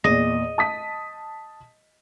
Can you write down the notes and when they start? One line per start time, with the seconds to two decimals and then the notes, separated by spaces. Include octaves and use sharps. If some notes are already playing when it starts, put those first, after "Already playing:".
0.04 E2 A#2 D#5
0.58 A5 D#6 B6